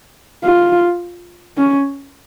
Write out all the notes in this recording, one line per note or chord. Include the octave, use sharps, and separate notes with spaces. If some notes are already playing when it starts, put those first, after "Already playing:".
F4
C#4